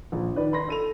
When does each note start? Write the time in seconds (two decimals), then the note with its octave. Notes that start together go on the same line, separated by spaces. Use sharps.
0.12 A#1
0.36 D#3 B4 D5
0.53 B5 C6 A#6
0.69 A4 D#7 F7